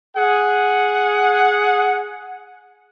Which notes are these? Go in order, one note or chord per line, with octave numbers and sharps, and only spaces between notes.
G#4 F#5